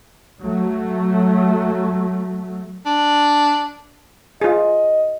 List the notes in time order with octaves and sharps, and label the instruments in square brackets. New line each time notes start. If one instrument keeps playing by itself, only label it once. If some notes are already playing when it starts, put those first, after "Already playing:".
[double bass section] F#3 A3
[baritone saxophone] D4
[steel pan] F4 G#4 [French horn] D#5